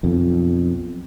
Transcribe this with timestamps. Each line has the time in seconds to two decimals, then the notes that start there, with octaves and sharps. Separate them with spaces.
0.03 B1 F2